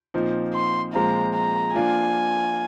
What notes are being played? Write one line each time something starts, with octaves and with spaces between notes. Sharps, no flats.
A#2 F3 C4 D#4
C6
A#2 F3 G#3 C4 F4 A#5
A#5
F3 A#3 D4 F4 G#5